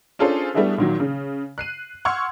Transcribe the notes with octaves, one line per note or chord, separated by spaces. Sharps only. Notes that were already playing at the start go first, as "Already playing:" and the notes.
C#4 D4 F4 G#4 A4 C5
G3 A3 B3 D4 E4 G#4
A#2 D#3 F#3
C#3
F#6 C7 D#7
F#5 C6 C#6 E6 F6 G#6